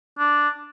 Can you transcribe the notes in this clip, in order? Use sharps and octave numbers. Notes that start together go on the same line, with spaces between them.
D4